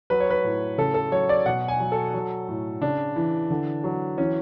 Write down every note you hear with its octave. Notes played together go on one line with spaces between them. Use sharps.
F#3 B4
C#5
B4
A2
C#3 A4
A4
F#3 C#5
D5
B2 F#5
G#5
F#3
A4
F#3
A2
C#3 D4
E3
D3
F#3
E3 C#4